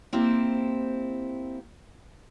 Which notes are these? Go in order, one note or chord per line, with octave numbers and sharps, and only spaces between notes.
A#3 C4 E4 G4 C5